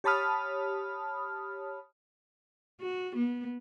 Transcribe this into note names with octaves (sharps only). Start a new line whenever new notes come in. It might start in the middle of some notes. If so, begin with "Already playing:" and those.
G4 C#5 A5 B5 D#6 F6
F#4
B3